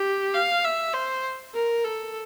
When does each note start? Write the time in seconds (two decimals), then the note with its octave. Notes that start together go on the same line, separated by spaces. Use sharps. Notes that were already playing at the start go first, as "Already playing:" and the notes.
Already playing: G4
0.34 F5
0.64 E5
0.94 C5
1.54 A#4
1.84 A4